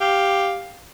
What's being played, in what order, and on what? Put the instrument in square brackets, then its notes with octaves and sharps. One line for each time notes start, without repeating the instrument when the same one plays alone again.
[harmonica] G4 F5